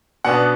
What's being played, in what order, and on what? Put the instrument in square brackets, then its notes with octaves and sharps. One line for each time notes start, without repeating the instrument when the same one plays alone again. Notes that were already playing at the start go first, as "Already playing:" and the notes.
[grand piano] B2 B3 D4 F#5